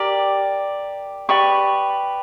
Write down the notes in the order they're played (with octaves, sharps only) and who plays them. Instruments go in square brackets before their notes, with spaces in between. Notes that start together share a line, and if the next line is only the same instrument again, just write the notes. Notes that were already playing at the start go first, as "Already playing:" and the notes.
Already playing: [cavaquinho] G4 A#4 D5
G4 B4 D5 C#6